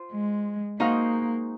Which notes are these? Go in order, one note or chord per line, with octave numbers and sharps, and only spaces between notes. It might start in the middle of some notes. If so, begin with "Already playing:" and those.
Already playing: F4 C5
G#3
G#3 A#3 D#4 F#4 C5 F5